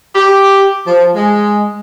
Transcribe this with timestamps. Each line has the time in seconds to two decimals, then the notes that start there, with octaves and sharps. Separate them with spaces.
0.15 G4
0.86 F3
1.15 G#3